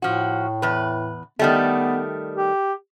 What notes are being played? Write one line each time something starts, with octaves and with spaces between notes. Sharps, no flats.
A2 F3 F#4
E2 B4
D#3 G3 A3 B3
G4